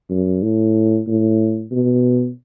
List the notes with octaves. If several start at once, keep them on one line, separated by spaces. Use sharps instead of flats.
F#2
A2
A2
B2